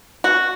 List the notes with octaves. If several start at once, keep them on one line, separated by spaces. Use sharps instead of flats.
F#4